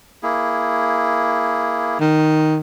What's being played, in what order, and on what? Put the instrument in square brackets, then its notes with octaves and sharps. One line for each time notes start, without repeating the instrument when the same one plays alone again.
[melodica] A#3 E4 G#4
[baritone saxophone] D#3